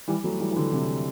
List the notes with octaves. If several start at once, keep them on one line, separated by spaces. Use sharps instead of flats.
E3 G3
F#3 A3
E3 G3
E3
D3 F#3
C3 E3